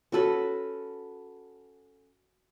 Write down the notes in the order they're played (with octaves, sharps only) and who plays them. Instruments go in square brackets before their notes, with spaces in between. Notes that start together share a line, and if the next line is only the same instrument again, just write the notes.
[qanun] C#4 F#4 A4 B4